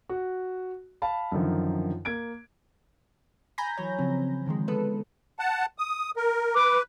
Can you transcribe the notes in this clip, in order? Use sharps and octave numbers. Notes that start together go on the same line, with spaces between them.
F#4
F5 A5 B5
F#2 D3 D#3 F3
A#3 G#6 D7
G#5 A#5 B5 G6 A#6
E3 F#3 C#5
C#3 F3 C4
D3 D#3 F3 G#3
G#3 B3 A4 B4
F#5 A5
D#6
A#4
B4 D6